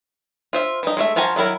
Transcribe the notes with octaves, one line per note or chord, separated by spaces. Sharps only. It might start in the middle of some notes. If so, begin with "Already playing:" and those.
F4 C5 E5
E3 D#4
G#3 A3 E5
F3 F4 F#4 G#5 A#5
D#3 F#3 E4 A#4